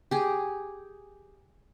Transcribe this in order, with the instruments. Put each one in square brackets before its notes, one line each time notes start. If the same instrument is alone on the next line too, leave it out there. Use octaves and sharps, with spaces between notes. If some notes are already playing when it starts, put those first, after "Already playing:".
[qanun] G4 G#4